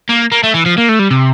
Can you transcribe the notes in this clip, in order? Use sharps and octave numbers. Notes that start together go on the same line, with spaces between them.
A#3
A#3
A3
E3
F3
A#3
A3
G3
C3